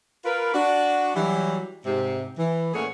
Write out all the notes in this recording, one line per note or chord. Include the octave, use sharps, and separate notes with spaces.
F4 A#4 B4
D4 F#4
E3 F#3 G3
G#2 C3
E3
A#2 A3 C#4 G#4 C#5 F#5